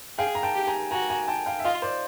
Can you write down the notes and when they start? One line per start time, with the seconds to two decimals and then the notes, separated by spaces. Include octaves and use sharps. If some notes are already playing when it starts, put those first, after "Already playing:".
0.18 G#4 F5 G5
0.35 A#5
0.43 G5 A5
0.55 G4
0.67 G#5 A#5
0.91 F#4 G#5 A#5
1.09 G#5 A#5
1.28 G5 A5
1.46 F5 G5
1.60 E5
1.64 F4 D#5 F5
1.82 C5 D5